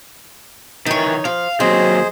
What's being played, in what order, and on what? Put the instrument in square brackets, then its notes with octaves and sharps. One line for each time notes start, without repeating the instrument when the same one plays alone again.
[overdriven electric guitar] D#3 E3 [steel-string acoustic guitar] D#4 C#5
[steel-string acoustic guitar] F3 [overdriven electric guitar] F5
[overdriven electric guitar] D#2 F#3 [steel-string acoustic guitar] C4 [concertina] G#4 C5 D#5